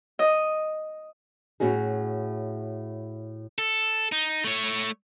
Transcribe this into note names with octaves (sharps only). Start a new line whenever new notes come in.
D#5
A2 C#4 F#4 G#4
A4
D#4
A3 C#5